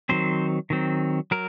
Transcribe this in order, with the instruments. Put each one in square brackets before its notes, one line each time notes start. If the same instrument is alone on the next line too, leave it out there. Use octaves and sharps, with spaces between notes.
[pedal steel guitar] D#3 F#3 C4 C5
D#3 F#3 C4
F#3 A#4